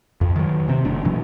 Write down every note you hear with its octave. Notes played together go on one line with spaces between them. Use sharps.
F2
D#3 F#3
C3 C4
F#1 A3 D4
A#2 E3 F#3